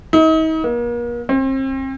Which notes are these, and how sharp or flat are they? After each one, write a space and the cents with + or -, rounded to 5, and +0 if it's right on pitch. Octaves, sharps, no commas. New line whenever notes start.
D#4 +40
A#3 +40
C4 +35